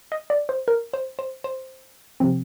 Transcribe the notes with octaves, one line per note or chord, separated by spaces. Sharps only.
D#5
D5
C5
A#4
C5
C5
C5
C3 F3 C4